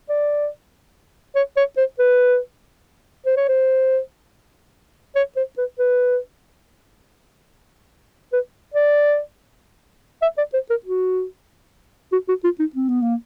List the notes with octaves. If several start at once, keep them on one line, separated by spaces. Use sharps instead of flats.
D5
C#5
C#5
C5
B4
C5
C#5
C5
C#5
C5
B4
B4
B4
D5
E5
D5
C5
A#4
F#4
F#4
F#4
F4
D#4
C4
B3
A#3